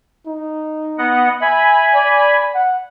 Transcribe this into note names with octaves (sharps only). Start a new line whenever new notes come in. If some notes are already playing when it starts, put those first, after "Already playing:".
D#4
B3 D#5 F#5
E5 G#5 B5
D5
F#5